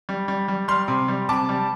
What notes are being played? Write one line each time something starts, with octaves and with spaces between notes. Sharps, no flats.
G3
G3
G3
G3 C6 F6
C3
G3
C3 A5 D6
G3